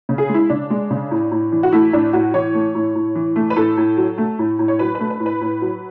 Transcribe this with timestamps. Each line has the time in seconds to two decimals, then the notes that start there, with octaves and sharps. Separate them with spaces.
0.09 C#3
0.18 G#4
0.29 G#3
0.34 E4
0.50 C#3 D4
0.70 G#3
0.91 C#3
1.11 A2
1.31 A2
1.52 E3
1.63 F#4
1.72 A3 E4
1.93 A2 D4
2.13 A2 F#4
2.34 E3 C#5
2.54 A3
2.75 A2
2.95 A2
3.15 E3
3.36 A3
3.50 B4
3.56 A2 A4
3.77 A2
3.97 F#3
4.18 A3
4.39 A2
4.59 A2
4.68 C#5
4.79 F#3 B4
4.95 A3 B4
5.10 B4
5.20 A2
5.26 B4
5.41 A2
5.61 F#3